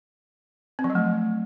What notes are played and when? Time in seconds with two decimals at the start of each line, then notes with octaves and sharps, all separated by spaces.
0.79 C4
0.84 F3
0.90 F#3
0.95 A3